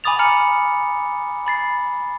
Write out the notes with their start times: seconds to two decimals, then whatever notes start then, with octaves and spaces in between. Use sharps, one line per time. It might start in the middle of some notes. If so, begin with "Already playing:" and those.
0.04 G#5 B5 D6 D#6 A6 F7
0.19 A#5 B5 F6 C#7
1.46 B5 A6 C7